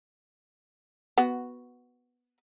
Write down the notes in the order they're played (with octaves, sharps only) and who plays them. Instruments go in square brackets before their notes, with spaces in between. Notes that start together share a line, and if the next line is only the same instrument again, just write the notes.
[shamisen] B3 F#4